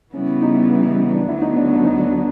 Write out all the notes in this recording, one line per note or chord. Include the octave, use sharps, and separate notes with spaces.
C#3 E3 G3 B3 C#4
D#4
D4
D2 D3 F#3 B3 E4
D#4
D4
D4
D#4
D4
D4